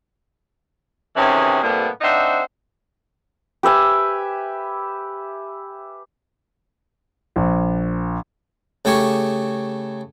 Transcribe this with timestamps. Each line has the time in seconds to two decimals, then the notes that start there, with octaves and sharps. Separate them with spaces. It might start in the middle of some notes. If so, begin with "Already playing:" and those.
1.17 C3 D#3 E3 C#4 F#4 G#4
1.62 A2 C3 G3 A#3 B3
2.02 C4 D4 D#4 C5 E5 F#5
3.63 G4 B4 E5 G#5
7.36 A#1
8.85 C#3 A3 G4 G#5 C#6